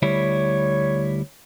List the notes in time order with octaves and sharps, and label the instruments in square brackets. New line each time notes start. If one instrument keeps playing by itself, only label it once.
[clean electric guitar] D2 G3 E4 [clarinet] C#5